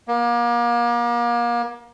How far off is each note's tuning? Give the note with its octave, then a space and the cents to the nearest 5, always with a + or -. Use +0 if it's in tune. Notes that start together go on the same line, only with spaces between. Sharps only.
A#3 +35